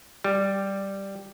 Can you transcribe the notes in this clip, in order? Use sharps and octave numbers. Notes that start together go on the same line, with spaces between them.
G3